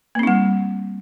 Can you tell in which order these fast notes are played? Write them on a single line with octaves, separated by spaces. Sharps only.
A#3 C4 D#4 G3